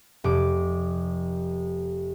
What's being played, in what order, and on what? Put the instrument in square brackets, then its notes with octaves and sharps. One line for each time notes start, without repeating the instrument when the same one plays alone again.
[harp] F1 D6